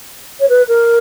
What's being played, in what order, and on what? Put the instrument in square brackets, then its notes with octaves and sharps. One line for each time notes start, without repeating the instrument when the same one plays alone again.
[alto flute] C#5
B4
A#4